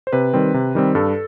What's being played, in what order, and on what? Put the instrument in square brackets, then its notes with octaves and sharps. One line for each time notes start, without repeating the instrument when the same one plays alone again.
[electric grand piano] C5
C3 B4
D#3 G3 C4
C3
D#3 G3 C4
G2 A4